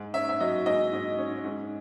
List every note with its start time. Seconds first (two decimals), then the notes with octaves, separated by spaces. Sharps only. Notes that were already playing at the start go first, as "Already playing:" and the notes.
Already playing: G#2
0.14 C#4 E5
0.29 E5
0.40 F#3 D#5
0.66 G#2 D#5
0.93 G#2
1.18 C#4
1.45 G#2